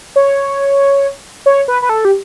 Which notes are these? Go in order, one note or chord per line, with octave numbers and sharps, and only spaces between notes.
C#5
C#5
B4
B4
A4
G4